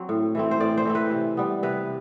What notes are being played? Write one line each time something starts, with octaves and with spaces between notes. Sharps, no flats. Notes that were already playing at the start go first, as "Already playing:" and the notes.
Already playing: F#3 C4
A2
E3 A3 C4
C5
A2 D5
C5
E3 A3 C4
B4
C3
G3 B3
C3 B4